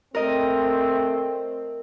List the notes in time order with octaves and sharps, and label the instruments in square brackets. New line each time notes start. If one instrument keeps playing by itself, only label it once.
[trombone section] A3 C4 [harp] A#4 D#5